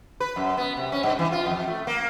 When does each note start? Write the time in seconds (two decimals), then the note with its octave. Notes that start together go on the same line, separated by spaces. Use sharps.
0.20 B4
0.36 F#2
0.57 B3
0.77 C3
0.92 C#4
1.03 G2
1.19 E3
1.32 F4
1.46 F2
1.67 A3
1.87 A#3